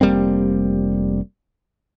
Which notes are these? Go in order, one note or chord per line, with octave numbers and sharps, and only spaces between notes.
F1 G3 A#3 C4